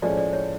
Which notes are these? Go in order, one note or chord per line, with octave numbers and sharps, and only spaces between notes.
A2 F3 G#3 C#4 D5
D5
C#5